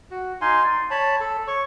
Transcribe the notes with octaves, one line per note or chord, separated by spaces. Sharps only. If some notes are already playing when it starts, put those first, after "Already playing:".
F#4
D#4 F5 G#5 C6
D5
C#5 A5 B5
A4
C#5 C#6